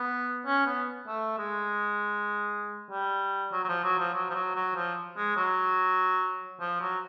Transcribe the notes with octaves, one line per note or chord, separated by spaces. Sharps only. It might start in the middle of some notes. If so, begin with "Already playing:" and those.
Already playing: B3
C#4
B3
A3
G#3
G3
F#3
F#3
F3
F#3
F3
F#3
F3
F#3
F#3
F3
G#3
F#3
F3
F#3